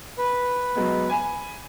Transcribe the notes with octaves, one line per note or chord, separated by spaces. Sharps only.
B4
F#3 G#3 B3
G#5 B5